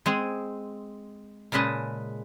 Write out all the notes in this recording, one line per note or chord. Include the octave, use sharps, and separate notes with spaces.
G#3 C4 G#4
A#2 C#3 G#3 B4 D#5 A5